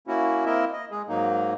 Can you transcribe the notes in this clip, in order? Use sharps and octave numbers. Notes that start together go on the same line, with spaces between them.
A#3 C#4 E4 F#4
A#3 C4 E4 A#4 D#5 E5
D#5
G#3 G#4
G#2 F#3 A#3 D#4